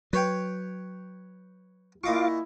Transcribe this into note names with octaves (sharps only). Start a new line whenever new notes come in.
F#3 B4 C#5 G5
A#2 E4 F4 D#5 F5 C#6 D6